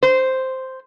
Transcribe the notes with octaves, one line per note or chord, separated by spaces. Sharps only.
C5